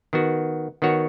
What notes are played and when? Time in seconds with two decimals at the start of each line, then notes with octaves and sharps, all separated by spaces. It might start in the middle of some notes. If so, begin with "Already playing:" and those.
0.13 D#3 B3 F#4
0.82 D#3 B3 F#4 C#5